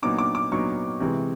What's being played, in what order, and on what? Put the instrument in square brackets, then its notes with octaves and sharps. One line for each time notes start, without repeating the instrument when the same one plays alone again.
[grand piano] A#2 F#3 B3 D#4 D6
D6
D6
A#2 F#3 B3 D#4 C#6
C3 E3 G#3